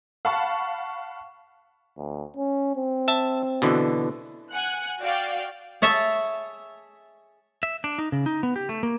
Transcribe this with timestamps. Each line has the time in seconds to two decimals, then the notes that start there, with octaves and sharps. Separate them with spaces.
0.25 F5 F#5 A5 B5 C#6
1.98 D2
2.37 C#4
2.76 C4
3.08 E5 A5
3.62 B2 D3 E3
4.53 F#5 G#5 F#6
5.00 F#4 D5 F5 G5
5.82 G#4 C#5 E5 A5
7.63 E5
7.84 D4
7.98 D#4
8.12 C#3
8.26 D#4
8.43 B3
8.56 G4
8.69 A3
8.83 A#3